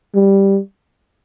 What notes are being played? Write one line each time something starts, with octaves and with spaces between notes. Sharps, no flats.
G3